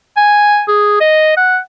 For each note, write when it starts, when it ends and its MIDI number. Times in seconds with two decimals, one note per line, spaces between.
0.17 0.63 80
0.68 0.97 68
1.01 1.35 75
1.37 1.59 78